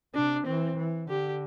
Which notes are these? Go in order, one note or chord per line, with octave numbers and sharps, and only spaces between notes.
C3 D4
E3 C4
E3
D3 G4